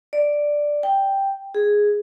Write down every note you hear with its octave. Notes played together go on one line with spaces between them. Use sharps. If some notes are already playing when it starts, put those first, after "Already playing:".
D5
G5
G#4